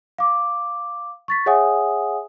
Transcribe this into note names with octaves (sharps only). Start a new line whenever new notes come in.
F5 D6
C#6 A6 B6
G#4 C#5 E5 F#5 G#5 D#6